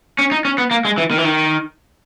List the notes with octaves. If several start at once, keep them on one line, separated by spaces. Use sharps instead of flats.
C#4
D#4
C#4
B3
A#3
G#3
E3
D#3
E3
D#3